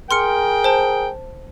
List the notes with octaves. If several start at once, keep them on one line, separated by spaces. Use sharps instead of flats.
G#4 A#4 G5 C6 F6 C#7
C5 A5